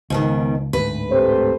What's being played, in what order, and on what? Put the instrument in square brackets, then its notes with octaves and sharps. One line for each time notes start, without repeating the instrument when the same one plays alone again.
[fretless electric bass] C#2 [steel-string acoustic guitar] G#2 B2 D#3
[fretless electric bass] D1 D2 G#2 [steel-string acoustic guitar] B4
[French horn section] C3 A3 C5